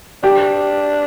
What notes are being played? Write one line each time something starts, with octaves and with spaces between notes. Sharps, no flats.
D4 G4